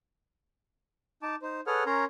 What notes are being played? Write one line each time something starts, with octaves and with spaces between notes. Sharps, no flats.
D#4 A5 D6
D#4 C5
G#4 A4 B4 C#5 F#5 F6
C#4 A#4 C#5 A#5 C6